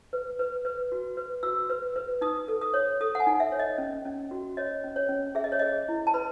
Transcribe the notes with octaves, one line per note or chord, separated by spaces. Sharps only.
B4
B4
B4
F#4
B4
F#4 E6
B4
B4
D#4 D#6
A4
D#6
C#5
A4 D#6
F#5
G#5
D#4
E5
C#5
D#5
C#4
C#4
F#4
C#5 D#5
C#4
C#5
C#4
G#4 E5
D#5
C#5
G#4 D#5
E4
A5
B4 B5